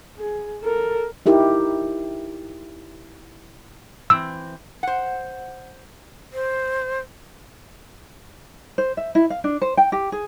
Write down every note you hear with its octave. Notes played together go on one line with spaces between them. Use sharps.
G#4
A4 A#4
D#4 E4 G4 A#4
E3 C4 E6
C5 F#5
C5
C5
E5
E4
F5
D4
C5
G5
G4
G#4